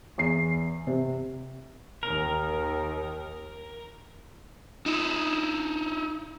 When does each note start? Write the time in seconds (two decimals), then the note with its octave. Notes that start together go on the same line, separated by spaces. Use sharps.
0.18 E2 C7
0.87 C3
2.03 D#2 D#3 A#4
4.86 D#4 E4